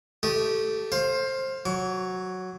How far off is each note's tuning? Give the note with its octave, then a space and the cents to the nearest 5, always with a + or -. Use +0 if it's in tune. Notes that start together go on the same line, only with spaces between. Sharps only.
A3 +0 G4 -15 D#6 +0
C5 +20 F5 +0
F#3 +0 D6 -45